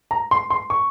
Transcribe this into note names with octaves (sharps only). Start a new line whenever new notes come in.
A#5
C6
C6
C#6